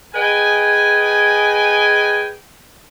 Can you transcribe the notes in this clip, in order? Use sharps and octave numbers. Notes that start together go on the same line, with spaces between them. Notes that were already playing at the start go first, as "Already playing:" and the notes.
G#4 B4 D#5 G5 G#5